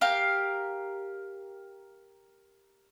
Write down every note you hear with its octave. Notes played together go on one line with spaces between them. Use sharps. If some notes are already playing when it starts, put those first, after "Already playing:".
G4 A#4 F5